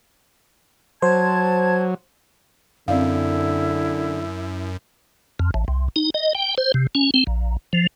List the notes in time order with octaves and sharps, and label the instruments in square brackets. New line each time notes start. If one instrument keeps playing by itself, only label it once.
[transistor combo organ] F#3 [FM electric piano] C5 [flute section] A5 G#6
[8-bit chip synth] F#2 [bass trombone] D3 [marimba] C4 D5 F5 [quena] E4
[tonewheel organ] F2
A1
C2
D#4
D#5
G5
C5
C3
C#4
C4
A#1
F3